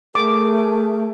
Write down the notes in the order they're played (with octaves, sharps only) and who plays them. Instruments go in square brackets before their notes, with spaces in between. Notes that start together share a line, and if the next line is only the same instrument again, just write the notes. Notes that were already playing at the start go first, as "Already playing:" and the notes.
[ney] A3 [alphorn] G#4 [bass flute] A#4 [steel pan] D6